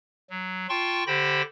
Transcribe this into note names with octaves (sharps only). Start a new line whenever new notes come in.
F#3
F4 G5 A5 C6 C#6
D3 G4 C5 G5 B5 A#6